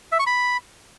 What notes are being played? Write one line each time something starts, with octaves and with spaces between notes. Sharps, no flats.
E5
C#6
B5